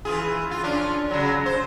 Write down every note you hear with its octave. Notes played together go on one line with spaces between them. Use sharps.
E3 F4 G#4
F4
C#4 D4 F4
C#3 F#3
C5